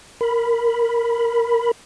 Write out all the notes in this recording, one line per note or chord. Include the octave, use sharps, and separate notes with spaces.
A#4 B5